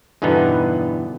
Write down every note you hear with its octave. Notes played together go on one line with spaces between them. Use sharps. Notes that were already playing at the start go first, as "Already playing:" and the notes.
E2 G2 B2 D3 B3 D#4